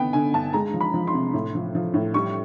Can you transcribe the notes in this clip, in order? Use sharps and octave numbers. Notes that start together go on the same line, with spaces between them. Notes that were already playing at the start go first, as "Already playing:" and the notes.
Already playing: D3 B3 G5
D3 G#5
G2 A5
G#3 A#5
F3
B5
F3
C6
C3
A2
F3
F3
A2
G3 C#6